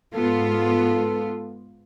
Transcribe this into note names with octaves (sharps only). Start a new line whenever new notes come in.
G#2 B3 F4 A4